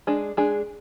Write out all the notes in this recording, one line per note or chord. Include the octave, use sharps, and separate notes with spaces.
G#3 D4 G#4
G#3 D4 G#4